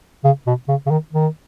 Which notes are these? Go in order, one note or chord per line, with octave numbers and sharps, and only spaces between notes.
C#3
B2
C#3
C#3
D#3
D#3